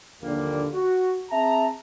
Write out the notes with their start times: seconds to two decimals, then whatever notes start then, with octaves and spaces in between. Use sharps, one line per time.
0.21 A#1 D#2 A#2 D3 G3 A#3
0.73 F#4
1.31 C4 G#4 E5 A5 A#5